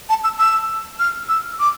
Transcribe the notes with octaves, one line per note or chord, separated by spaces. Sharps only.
A5
E6
E6
F6
E6
D6